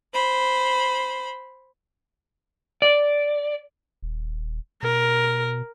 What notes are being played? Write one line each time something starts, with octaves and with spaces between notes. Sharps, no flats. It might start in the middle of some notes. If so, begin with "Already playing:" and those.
C5 B5
D5
D#1
B2 A#4